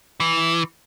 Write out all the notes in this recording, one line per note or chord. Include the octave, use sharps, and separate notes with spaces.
E3